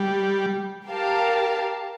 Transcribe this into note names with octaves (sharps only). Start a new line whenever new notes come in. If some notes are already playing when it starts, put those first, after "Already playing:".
Already playing: G3
G4 A#4 F5 A5